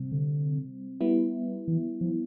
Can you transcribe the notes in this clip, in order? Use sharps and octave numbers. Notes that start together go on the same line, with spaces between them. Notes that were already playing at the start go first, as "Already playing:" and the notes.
Already playing: C3 G3 C4
D3
G3 B3 E4
E3
F3